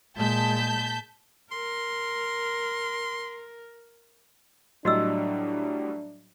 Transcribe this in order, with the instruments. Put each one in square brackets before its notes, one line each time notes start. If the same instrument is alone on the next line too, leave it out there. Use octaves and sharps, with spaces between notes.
[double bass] A#2 G#3 [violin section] A5 G6 B6
[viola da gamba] A#4 [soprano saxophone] C6
[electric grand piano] A2 F#3 G3 [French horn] D4 [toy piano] F#4 D#5 E6